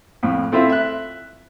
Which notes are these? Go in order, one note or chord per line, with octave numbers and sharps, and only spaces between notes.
F2 A2
A3 C4 E4 F4 C5 E5
E5 F#6